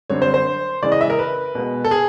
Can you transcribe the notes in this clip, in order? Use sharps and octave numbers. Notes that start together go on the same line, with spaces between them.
F#2 D3 G3 C4 C#5
C5
C5
C#3 E3 G#3 D5
D#5
E5
A#4
B4
B2 G#3 B3
A4
G#4